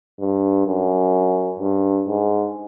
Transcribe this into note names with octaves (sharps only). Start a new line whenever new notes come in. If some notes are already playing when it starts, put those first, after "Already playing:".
G2
F#2
G2
G#2